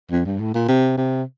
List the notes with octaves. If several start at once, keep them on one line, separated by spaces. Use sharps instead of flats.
F2
G2
A2
A#2
C3
C3